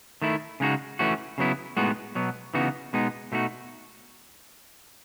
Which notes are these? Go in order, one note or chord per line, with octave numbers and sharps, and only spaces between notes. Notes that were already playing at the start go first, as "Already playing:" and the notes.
D#3 A3 E4
C#3 G#3 D#4 F#4
E3 A3 C#4 F#4
C#3 F#3 B3 E4
A2 G#3 B3 D#4 F#4
B2 F#3 B3
C#3 E3 B3 D#4 F#4
B2 G#3 B3 D#4
B2 A3 D#4 F#4